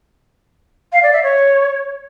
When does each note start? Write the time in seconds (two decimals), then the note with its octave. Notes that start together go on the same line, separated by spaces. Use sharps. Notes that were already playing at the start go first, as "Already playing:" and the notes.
0.93 F5
1.03 D5
1.13 E5
1.23 C#5